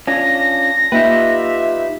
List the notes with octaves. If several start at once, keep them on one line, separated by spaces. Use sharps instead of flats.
C#4 D4 F4 A#6
A#3 D#4 F4 G4 B4 E5